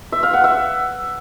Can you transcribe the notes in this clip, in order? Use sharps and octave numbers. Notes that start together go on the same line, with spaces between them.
E5
F5
F#5
E5